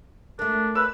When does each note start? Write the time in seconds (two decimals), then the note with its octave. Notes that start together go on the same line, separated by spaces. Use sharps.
0.39 A3 D4 A#4
0.75 B4 E6